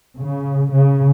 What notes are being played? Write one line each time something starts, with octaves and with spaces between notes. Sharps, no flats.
C#3
C#3